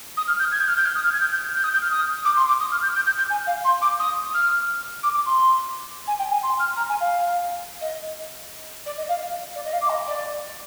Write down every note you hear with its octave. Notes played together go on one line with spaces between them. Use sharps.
D#6
F6
G6
G#6
G6
F6
G6
F6
D#6
F6
G#6
G6
G6
G6
D#6
G6
F6
D#6
D6
C6
D6
D#6
F6
G6
G6
G6
G6
G#5
F5
C6
D6
D#6
F6
D6
D6
C6
G#5
G5
G#5
C6
F6
A#5
G#5
F5
D#5
D5
D#5
F5
D5
D#5
F5
D6
D#5
D5